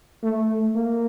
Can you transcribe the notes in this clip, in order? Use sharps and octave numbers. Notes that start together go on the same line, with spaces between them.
A3
A#3